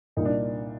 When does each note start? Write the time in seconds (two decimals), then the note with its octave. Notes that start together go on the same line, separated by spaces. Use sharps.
0.16 C2 A#2 G3 A#3 D#4
0.25 D4